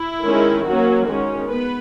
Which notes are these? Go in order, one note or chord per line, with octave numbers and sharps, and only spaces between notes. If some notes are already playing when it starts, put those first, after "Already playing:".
Already playing: E4
D#3 G#3 C#4
F#3 A#3 C#4 F#4
D#3 G#3 C#4
B3 B4